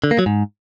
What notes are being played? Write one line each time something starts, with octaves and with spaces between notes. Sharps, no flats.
D3
A#3
F#3
G#2